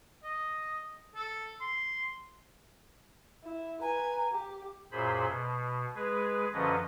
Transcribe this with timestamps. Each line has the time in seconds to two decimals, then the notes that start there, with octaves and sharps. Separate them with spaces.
0.23 D#5
1.15 A4
1.61 C6
3.44 E4
3.82 B4 G#5 A#5
4.32 G4
4.92 F#2 A#2 G#4 C5 B5
5.27 B2
5.95 G#3 G#4 B4
6.53 F#2 D3 F3 C#4 B4 D#5